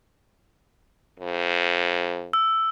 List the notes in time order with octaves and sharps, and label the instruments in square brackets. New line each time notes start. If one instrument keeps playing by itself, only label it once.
[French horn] F2
[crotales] E6